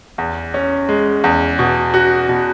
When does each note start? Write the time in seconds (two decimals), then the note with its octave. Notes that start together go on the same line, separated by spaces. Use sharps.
0.18 E2
0.54 C#4
0.89 G#3
1.24 E2
1.59 B2
1.94 F#4
2.29 B2